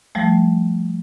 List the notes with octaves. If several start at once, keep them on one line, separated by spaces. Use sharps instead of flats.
F3 G3 A3